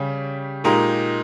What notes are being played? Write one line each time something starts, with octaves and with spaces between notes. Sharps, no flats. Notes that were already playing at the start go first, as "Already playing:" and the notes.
Already playing: C#3 G3 C#4 G4
A#2 G#3 D#4 G4 A#4